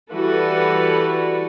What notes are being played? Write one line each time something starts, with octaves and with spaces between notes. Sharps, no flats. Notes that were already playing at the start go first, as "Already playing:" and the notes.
E3 G3 F#4 A4 B4 D5